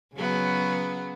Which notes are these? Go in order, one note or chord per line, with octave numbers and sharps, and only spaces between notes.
C#3 F#3 B3